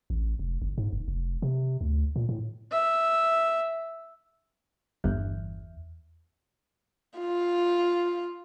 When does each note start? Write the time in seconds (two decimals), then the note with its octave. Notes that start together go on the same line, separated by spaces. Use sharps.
0.10 A1
0.39 F1
0.62 G1
0.78 G#2
0.93 F#1
1.08 F1
1.42 C3
1.81 D2
2.16 A#2
2.29 A2
2.72 E5
5.04 G1 E2
7.18 F4